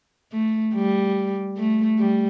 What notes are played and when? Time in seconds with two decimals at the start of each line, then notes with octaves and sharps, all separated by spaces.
0.33 A3
0.74 G3
1.57 A3
1.99 G3